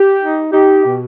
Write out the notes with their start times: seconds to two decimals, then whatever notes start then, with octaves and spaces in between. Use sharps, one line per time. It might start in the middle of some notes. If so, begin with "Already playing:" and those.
Already playing: G4
0.21 D#4
0.52 D#4 G4
0.84 B2